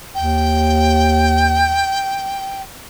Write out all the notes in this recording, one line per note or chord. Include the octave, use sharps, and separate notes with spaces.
D#2 G5